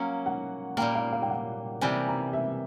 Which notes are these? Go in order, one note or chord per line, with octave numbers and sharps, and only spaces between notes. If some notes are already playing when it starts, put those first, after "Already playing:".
Already playing: F#3 A#3 C#4 F5
F#5
A#2 G3 A#3 G5
F5
F5
G5
F#5
C3 E3 G3 G#5
A#5
E5